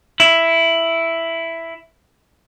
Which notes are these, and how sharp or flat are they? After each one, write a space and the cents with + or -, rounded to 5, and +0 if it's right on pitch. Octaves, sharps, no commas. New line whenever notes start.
E4 +5